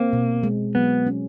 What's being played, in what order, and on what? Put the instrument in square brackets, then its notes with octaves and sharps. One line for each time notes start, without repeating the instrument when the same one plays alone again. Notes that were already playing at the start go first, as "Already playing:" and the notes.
Already playing: [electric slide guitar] A#3 [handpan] C4
[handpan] B2
G#3
[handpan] F#3 [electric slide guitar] B3
[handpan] C#4